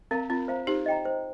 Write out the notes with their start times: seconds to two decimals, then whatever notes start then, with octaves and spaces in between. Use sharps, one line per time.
0.11 C4 A#4 F5 A#5
0.30 C4 F4
0.48 C5 F5 A#5
0.67 D#4 G4 C5
0.86 D#5 G5 A#5
1.05 C5